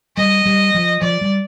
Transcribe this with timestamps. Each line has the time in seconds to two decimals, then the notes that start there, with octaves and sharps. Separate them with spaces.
0.17 G3 D#5
0.45 G3
0.74 F3
1.01 F3 D5
1.21 G3